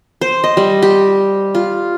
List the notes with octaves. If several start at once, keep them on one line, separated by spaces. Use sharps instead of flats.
C5
D#5
G3
G4
F4